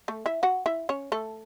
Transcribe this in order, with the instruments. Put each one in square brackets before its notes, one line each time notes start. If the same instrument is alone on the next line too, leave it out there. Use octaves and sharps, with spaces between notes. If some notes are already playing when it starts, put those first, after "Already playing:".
[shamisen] A3 A4
E4 E5
F#4 F#5
E4 E5
C#4 C#5
A3 A4